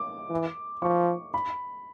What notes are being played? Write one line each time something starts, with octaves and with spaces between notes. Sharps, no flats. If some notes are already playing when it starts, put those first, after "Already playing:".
Already playing: D6
E3
F3 C#6
B5